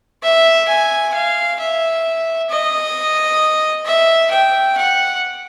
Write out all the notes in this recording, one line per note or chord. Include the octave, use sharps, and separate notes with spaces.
E5
G#5
F5
E5
D#5
E5
G5
F#5